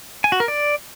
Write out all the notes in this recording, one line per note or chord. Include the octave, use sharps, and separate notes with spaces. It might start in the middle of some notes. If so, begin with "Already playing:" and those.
G#5
F#4
A#4
D5